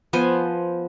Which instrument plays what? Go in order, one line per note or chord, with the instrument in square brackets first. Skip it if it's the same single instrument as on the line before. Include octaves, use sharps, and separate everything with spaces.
[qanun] F3 B3 C5 G#5